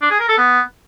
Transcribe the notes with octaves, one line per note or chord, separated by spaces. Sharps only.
D4
G#4
A#4
A4
B3